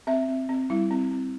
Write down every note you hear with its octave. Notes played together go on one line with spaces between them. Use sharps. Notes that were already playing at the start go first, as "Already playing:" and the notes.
C4 E5
C4
C4
G3 E4
C4
C4